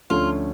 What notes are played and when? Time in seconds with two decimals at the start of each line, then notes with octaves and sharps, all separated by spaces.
0.10 D2 D3 F3 A3 C#4 F4